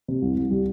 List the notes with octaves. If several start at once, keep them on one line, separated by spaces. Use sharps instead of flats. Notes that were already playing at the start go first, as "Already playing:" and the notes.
C3
C2
C2
G3